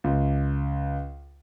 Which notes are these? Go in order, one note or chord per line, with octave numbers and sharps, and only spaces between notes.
C#2